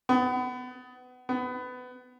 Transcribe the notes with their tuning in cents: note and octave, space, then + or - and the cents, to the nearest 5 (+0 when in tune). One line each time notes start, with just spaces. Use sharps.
B3 +25
B3 +20